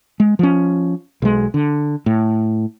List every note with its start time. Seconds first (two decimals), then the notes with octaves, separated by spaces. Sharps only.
0.20 G#3
0.39 F3 C#4
1.22 B1 G#3
1.54 D3
2.06 A2